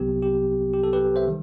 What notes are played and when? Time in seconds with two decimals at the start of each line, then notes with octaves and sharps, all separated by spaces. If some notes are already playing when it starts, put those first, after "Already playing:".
Already playing: C2 C3 F#3 B3 G4
0.22 G4
0.73 G4
0.83 A4
0.93 G4 B4
1.16 C5 E5
1.28 D#3 G3